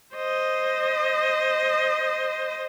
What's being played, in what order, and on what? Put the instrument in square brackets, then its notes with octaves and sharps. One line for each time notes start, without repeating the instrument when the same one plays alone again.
[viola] C5 D#5